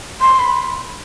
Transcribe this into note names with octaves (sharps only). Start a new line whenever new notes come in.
C6
B5